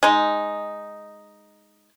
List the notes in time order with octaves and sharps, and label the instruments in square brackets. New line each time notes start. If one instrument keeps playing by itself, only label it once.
[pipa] G#3 D#4